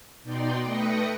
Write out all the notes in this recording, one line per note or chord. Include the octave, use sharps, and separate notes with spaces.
B2 D#4 D5 G5 C6
A3 B4 G5 D#6 A#6 C#7